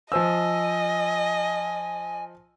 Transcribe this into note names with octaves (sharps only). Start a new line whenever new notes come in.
F3 C5 D#5 G#5 E6